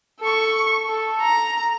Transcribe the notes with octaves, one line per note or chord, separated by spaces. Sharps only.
A4 C#6
A4
A#5